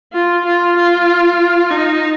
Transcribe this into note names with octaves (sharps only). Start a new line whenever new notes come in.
F4
F4
F4
D#4